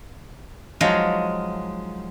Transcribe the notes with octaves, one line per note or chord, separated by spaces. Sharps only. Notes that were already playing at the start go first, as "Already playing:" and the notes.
F3 F#3 G#3 D#4 F5